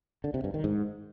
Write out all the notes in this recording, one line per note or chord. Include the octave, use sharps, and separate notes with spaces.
D3
C3
G2
D#3
G#2